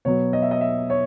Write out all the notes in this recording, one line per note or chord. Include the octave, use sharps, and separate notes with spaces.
B2 F#3 B3 C#5
D#5
E5
D#5
E5
C#5